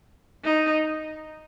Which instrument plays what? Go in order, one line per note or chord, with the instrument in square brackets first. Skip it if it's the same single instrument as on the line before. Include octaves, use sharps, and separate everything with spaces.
[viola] D#4